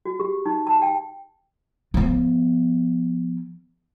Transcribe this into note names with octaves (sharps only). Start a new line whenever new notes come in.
F#4
G4
D#4
A5
G5
F3 B3